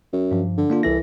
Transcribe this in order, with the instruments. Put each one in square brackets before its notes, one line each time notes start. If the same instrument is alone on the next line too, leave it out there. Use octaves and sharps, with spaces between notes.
[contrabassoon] F#2
[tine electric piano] G2 F3
[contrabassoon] D3
[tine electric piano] A#3 D4 F4
[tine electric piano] C2 A4 A#6 [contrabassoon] E3